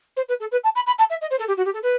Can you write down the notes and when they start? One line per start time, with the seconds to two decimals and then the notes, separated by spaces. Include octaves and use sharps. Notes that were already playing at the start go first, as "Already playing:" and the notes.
0.16 C5
0.29 B4
0.40 A4
0.52 B4
0.64 A5
0.75 B5
0.86 B5
0.98 A5
1.10 E5
1.21 D#5
1.31 C5
1.39 A4
1.48 G4
1.57 F#4
1.65 G4
1.74 A4
1.83 B4